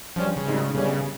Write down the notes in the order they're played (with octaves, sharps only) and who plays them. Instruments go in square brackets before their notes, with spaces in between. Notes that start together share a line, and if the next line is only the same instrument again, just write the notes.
[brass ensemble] G2 G3 C#4 [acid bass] F3
[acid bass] C#3
[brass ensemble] G#1 G#2 G3 C4 D#4
[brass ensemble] G1 G2 G3 C#4 [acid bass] C#3